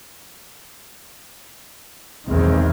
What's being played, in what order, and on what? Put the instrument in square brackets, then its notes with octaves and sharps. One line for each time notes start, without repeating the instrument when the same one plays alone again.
[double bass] B1 E2 [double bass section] D#3 G#3 C4